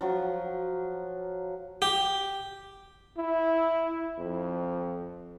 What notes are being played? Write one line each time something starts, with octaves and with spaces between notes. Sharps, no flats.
F3 F#3 F#4
G4
E4
F2